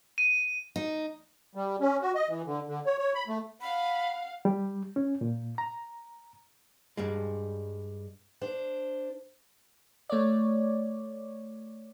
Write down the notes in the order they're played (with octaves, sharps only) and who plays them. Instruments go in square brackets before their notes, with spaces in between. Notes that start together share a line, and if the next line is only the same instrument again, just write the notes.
[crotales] D#7
[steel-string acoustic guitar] D#4
[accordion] G3
C#4
F#4
D#5
E3
D3
D3
C#5
C#5
B5
A3
[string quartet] F5 F#5 [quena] B5
[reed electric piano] G3
C#4
A#2
A#5
[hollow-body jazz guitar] G2 G3 G#3
[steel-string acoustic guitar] D4 C5
[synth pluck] A3 C#5 D5